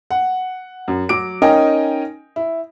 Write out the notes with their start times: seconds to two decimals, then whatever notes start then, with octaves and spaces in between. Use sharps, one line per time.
0.11 F#5
0.88 F#2
1.09 F#3 D6 D7
1.42 C#4 D#4 A#4 D#5 G5 G#5
2.36 E4